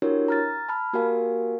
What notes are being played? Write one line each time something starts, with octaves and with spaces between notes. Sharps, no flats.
D4 E4 F#4 G4 A#4 C#5
A#5 F6 A6
A5 B5 F6
A#3 F#4 G4 A#4 F5 G#5